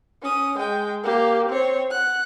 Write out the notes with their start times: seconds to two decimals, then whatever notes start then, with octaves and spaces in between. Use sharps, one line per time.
0.22 C#4 D#6
0.57 G#3 G5
1.03 A#3 G4
1.48 C4 C#5
1.91 F#5 F#6